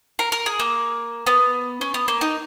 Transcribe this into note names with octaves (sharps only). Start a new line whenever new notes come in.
A#4
A#4
G#4
A#3
B3
C#4
B3
A#3
D#4